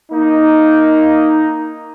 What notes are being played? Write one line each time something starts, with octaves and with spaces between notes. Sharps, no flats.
A#3 D#4